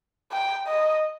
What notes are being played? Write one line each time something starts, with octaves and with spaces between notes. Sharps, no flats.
G5
D#5